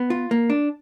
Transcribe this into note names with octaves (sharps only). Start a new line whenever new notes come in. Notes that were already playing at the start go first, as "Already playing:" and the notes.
Already playing: B3
F4
A#3
D4